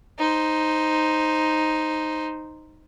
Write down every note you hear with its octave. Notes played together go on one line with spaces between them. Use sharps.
D#4 C5